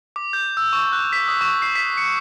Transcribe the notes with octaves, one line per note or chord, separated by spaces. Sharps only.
D6
G6
E6
C#6
F#6
B6
D#6
C#6
C7
B6
C#7